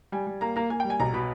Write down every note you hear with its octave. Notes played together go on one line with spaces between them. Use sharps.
G3 G#5
G3
A#3 A#5
A#3 A#5
A#3 G#5
G3 G5
G#5
B1 A#5
B2 B5